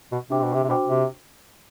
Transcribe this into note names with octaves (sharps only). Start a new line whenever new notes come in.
B2
C3 D4 F#4 C5 G5 D6
B2
C3
C3
B2 D4 F#4 C5 G5 D6
C3